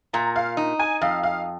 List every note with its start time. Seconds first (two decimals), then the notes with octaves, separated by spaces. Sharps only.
0.13 A#2 A#5
0.36 F5
0.57 D#4
0.79 G#5
1.02 F2 F5
1.23 F5